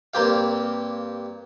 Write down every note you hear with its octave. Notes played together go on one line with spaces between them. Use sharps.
G2 A#3 C4 G4 F5